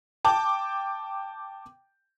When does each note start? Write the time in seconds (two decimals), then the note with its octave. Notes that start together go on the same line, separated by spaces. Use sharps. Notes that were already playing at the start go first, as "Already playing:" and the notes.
0.25 G5 A5 D6